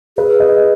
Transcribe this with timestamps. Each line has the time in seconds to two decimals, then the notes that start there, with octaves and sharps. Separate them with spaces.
0.17 G#4 B4
0.40 D#5